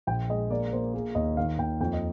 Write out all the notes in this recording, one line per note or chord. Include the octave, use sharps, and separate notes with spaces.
A#1 G5
G#3 D#5
A#3 D5
A#3 C5
A#3 G#4
D#2 D#5
D#3 F5
D#2 G5
F2 G5
D#5